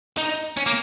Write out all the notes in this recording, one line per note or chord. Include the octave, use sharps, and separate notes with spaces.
D#4
C#4
A#3